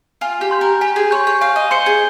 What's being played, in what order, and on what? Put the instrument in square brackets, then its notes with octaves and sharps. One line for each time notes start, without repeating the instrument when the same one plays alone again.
[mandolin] F4 [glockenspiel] G#5
[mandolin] G4
[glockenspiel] C6 G6
[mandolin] A#4
[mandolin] G4 [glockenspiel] G#5
[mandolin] G#4
[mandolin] C#5 [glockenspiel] C6 G6
[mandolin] C#5
[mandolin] F5 [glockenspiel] G#5
[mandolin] D#5
[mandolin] C5 [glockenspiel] C6 G6 C#7 G7
[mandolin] G#4